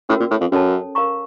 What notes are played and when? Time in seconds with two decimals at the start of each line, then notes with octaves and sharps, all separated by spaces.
0.09 A2 C#4 F#4 A#4
0.20 A#2
0.31 A2
0.41 F2
0.52 F#2 C#4 A4 C#5 A5
0.95 A#4 F5 A#5 C#6